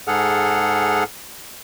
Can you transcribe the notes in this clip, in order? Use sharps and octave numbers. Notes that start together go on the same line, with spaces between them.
G#2 G#4 A4 F#5 F6